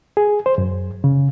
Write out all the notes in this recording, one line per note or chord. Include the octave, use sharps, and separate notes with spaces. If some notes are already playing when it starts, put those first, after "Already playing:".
G#4
C5
F#2
C#3